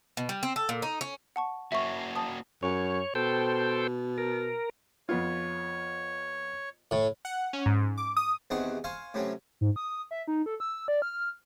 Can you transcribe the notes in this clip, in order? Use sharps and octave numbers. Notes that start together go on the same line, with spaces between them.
B2
G3
C4
A4
A#2
D#4
C#4
F#5 A5 C#6
A#3 C#4 F#4 E5 C#6
A5 D#6
F#2 C#5
B2 A4 C5 G5
A#4
F2 B3 F4 C#5
A2
F#5
C#4
G#2
D6
D#6
E2 C3 D#3 G#4 F#5 C#6
C5 F5 G#5 C#6
A2 C3 F#3 C#4
G#2
D#6
E5
D#4
A4
E6
D5
F6